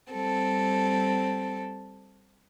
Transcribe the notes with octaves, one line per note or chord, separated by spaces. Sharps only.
G3 C4 A4